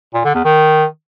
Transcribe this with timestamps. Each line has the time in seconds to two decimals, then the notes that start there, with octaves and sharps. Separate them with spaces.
0.14 A#2
0.24 D3
0.35 E2
0.45 D#3